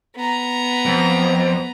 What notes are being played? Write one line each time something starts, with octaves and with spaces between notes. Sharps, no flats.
B3 A#5
F2